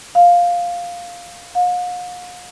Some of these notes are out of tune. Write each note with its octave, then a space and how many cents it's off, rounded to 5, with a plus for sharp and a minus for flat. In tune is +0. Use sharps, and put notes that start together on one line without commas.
F5 +5
F5 +45